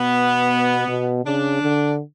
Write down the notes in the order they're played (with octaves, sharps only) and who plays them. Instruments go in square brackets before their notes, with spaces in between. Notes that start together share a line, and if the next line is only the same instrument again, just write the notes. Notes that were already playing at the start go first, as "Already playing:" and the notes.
Already playing: [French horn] B2 [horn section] B3
[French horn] B2
[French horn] C#3 [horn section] D4
[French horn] D3